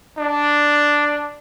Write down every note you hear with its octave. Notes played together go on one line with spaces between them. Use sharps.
D4